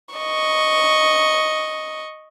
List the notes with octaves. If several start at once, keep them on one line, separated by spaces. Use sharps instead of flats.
D#5 C#6